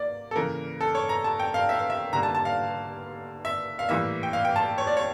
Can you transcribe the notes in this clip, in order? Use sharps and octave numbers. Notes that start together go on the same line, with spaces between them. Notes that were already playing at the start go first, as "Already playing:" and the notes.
Already playing: A#3 D5
A4
C#3 E3 A#3 A#4
A4
C#5
A#5
A5
G5
F5
E5
F5
E5
D3 G3 A#3 A#5
A5
A5
F5
E5
F5
A2 E3 G3 A#3 E5
G5
F5
G5
A5
C#5
D5
C#5